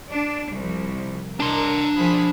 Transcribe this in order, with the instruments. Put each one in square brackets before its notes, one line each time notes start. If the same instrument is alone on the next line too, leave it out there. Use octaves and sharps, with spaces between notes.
[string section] D4
C2 F3
[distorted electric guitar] D4 C6 [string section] A#4
[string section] F3 G#4 B5